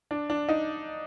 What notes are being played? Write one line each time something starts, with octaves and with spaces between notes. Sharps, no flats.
D4
D4
D#4